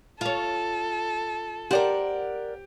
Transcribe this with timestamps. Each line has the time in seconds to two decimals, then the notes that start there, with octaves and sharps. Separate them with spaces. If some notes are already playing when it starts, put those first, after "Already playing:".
0.21 F4 A4 C#5
1.71 G4 A#4 C5 D5 F#5